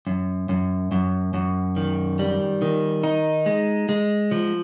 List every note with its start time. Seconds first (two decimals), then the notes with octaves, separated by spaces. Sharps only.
0.07 F#2
0.49 F#2
0.92 F#2
1.34 F#2
1.76 D#3
2.19 G3
2.62 D#3
3.03 D#4
3.46 G#3
3.89 G#3
4.31 F3